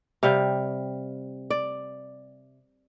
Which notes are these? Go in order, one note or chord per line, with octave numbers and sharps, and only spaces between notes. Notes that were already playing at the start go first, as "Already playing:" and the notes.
C3 G3 F5
D5